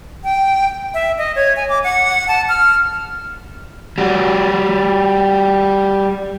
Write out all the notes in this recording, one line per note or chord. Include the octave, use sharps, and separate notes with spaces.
G5
E5
D#5
C#5
G#5
D6
F#5
A5
F6
G3 F#4